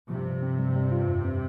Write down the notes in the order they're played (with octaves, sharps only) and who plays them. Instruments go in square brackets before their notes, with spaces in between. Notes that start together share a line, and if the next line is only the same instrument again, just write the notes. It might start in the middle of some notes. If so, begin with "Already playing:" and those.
[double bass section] G2 C3 [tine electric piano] F3
[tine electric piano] F3
C4
G3
G3
F4
F2
C4